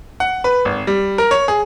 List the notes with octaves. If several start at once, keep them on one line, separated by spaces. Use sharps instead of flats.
F#5
B4
G#1
G3
A#4
C#5
G#4